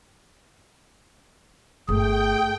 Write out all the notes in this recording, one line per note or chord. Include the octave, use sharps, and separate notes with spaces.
G1 A3 G#4 G5